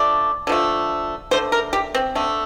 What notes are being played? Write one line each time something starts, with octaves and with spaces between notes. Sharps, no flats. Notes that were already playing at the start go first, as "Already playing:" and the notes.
Already playing: D3 F3 A3 D5
D3 F3 A3
D3 A3 C5
A#4
G4
C4
D3 A3